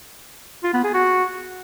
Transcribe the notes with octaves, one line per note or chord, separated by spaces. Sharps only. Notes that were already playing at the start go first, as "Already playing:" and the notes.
F4
B3
G#4
F#4